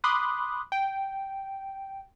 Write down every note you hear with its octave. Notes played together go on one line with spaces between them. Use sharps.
B5 C6 D6 D#6 F#6
G5